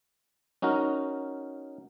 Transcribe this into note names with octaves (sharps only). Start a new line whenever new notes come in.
C#4 D#4 F#4 A#4